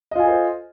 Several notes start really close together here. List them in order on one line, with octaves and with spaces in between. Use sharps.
D#5 F4 G#5 A4 C5